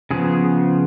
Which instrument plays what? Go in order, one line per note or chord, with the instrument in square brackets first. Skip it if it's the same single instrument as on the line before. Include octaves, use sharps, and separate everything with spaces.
[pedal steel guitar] C#3 F3 B3 G#4